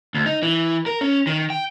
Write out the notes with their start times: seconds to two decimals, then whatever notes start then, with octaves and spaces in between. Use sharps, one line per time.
0.14 D2
0.26 D#4
0.43 E3
0.86 A#4
1.01 C#4
1.27 D#3
1.50 G5